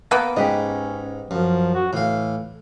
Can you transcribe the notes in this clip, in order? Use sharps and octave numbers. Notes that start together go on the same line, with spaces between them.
A#3 B3 D6
G#2 C#4 G4 B4 D#5
F#2 F3
F#4
A2 E3 F5